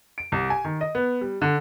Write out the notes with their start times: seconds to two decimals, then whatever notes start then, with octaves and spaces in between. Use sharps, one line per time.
0.18 D7
0.32 C2
0.50 G#5
0.65 D#3
0.81 D#5
0.95 B3
1.21 G3
1.42 D3